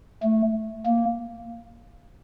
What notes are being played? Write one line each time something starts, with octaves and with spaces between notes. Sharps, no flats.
A3
A#3